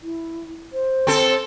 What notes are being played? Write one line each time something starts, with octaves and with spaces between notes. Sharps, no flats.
E4
C5
C4 A4